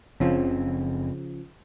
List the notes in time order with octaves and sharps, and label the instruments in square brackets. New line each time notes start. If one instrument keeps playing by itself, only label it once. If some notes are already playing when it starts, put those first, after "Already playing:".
[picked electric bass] F#1 C4 [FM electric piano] C#3 F3